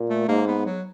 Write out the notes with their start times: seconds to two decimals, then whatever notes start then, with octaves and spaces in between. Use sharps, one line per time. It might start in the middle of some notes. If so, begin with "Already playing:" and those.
Already playing: A#2
0.10 A3
0.28 G#2 A#3
0.47 B3
0.65 F#3